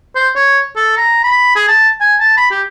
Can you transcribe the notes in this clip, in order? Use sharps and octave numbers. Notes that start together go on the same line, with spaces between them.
C5
C#5
A4
A#5
B5
G#4
A5
G#5
A5
B5
G4